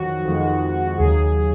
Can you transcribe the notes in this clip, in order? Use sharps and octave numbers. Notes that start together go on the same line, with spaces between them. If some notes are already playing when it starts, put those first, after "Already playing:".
Already playing: F2 D#3 F#3 F#4
F2 D#3 G#3
D#2 C#3 F#3 G#4